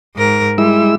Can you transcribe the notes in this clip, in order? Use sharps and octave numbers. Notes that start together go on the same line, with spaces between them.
G#2 A#4
G3 G#3 E4 E6